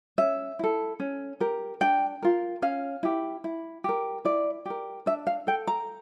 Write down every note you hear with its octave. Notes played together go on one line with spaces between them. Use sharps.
C#4 E5
E4 A4
C#4
G4 A#4
D4 G5
F4 A#4
C#4 F5
E4 G4
E4
G4 A#4
E4 D5
G4 A#4
D4 E5
F5
A4 G5
A#5